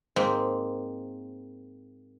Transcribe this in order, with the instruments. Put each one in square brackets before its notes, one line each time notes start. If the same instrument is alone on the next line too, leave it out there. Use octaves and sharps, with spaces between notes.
[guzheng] G#2 A#3 C4